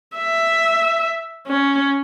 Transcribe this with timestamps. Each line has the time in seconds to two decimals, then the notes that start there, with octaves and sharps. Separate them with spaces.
0.18 E5
1.48 C#4